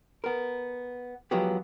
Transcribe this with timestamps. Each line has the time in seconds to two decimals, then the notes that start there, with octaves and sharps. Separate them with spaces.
0.24 B3 A#4
1.31 F3 F#3 G#3 B3 G4